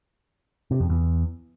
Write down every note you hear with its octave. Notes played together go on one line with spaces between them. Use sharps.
C3
F2
E2